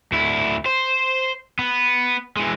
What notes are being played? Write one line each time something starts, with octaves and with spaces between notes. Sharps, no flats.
D2 E4
C5
B3
E3 G#3